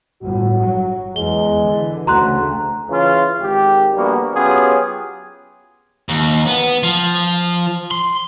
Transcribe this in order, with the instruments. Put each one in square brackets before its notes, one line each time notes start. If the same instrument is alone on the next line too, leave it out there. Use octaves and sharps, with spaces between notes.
[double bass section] G1 A2 [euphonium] F#4
[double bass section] F#3
[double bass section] E2 [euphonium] G#3 [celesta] G7
[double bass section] D3 E3
[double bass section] D2 C#3 A3 [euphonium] F#4 [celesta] A#5 C6 F#6
[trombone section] C#3 E3 F4
G#1 G4
A#1 D3 G3 A#3 B3 F#4
F#3 B3 C#4 F4 G4 G#4
[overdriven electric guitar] D#2
B3
F3
C6